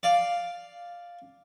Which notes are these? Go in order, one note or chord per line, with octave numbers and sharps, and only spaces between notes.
D5 F5